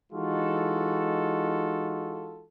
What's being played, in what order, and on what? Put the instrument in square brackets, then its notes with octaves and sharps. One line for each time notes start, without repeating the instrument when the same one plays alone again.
[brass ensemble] E3 G#3 D#4 F4 F#4 A4